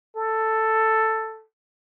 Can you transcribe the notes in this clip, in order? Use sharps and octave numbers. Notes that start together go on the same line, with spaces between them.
A4